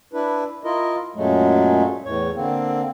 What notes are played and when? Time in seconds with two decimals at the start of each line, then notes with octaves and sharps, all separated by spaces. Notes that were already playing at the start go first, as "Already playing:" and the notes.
0.13 D4 E4 B4
0.64 E4 F4 A#4 D#5
1.15 F#2 A#2 F#3 G#3 A3
2.06 E2 A2 C#5
2.35 D3 A#3 C4